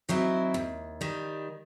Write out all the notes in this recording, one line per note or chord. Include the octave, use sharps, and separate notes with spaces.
D#3 F#3 C4 E4
D#2
D#3 G3